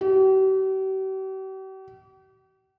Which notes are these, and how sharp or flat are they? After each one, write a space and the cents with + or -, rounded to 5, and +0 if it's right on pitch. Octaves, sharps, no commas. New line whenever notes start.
G4 -45